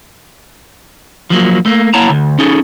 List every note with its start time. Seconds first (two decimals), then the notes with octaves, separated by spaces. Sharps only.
1.30 F3 F#3 A#3
1.66 A3 A#3
1.94 A#3 E4 C#5 F#5 A5 A#5
2.10 D2
2.39 C#4 D#4 G#4 A4